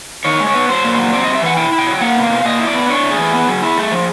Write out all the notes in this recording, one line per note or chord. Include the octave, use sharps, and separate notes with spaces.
D#3 C#5
G#3
C#5
B3
F#3 C5
A#2
F#3
C4 D5
G3 D#5
E5
E3 F#5
E4 G5
E4
G5
F#3
A#3 F#5
B2
F5
B2
A#2 D#5
E4
D5
B3
D4 C#5
A3
G#4
E3
B3
F#3
E4
A3
F3